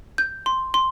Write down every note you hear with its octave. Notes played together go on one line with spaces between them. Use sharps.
G6
C6
C6